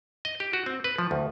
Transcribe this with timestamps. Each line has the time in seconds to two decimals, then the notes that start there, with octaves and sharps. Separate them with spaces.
0.25 D#5
0.40 G4
0.53 F#4
0.66 C4
0.84 B4
0.98 F3
1.11 D2